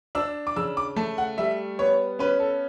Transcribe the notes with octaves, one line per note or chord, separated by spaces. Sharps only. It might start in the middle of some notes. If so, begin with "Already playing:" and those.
D4 E6
D6
C#3 E6
D6
A3 A5
F#5
G3 E5
B3 C#5
C#4 B4
A4